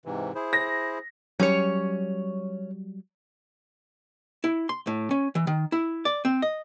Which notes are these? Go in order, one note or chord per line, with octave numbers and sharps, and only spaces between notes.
G#2 C3 E3
E4 G#4 C5
A#6
F#3 G3 C#4 C#5
E4
C6
A2
C#4
E3
D#3
E4
D5
C4
D#5